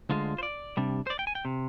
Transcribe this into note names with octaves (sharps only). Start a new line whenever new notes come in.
D2 D3 G#3 F4
C5
D5
C3 G3 D4
C5
D5
G5
G#5
G5
C3